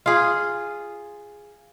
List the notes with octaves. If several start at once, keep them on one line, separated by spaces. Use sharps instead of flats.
F4 G#4